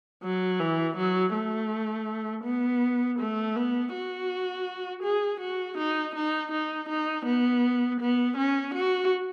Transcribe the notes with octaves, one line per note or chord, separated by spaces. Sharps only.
F#3
E3
F#3
A3
B3
A3
B3
F#4
G#4
F#4
D#4
D#4
D#4
D#4
B3
B3
C#4
F#4